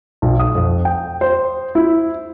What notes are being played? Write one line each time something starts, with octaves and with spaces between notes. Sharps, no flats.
B1
D#6
F2
G5
C5
E4